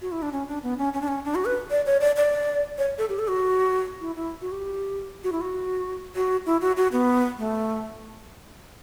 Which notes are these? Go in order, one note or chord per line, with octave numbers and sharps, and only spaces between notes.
F#4
E4
D4
C#4
D4
B3
C#4
C#4
D4
C#4
D4
F#4
B4
D5
C#5
D5
D5
C#5
A4
G4
A4
F#4
E4
E4
F#4
G4
F#4
E4
F#4
F#4
E4
F#4
F#4
B3
A3